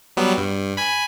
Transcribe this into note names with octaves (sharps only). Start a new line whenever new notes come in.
F#3 G3 B3
G2
G#5 B5